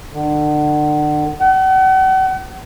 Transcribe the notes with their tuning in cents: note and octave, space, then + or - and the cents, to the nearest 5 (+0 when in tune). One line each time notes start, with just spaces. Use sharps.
D3 +35
F#5 +40